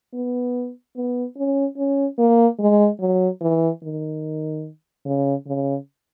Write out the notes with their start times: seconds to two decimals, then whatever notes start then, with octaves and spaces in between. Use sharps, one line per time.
0.13 B3
0.96 B3
1.37 C#4
1.77 C#4
2.18 A#3
2.59 G#3
3.00 F#3
3.41 E3
3.83 D#3
5.06 C#3
5.47 C#3